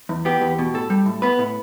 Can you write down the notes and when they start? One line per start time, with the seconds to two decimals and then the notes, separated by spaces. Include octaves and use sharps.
0.09 E2
0.25 B3 G4
0.41 E2
0.58 B2
0.74 A2 A4
0.90 G3
1.06 A2
1.22 B3 B4
1.39 A2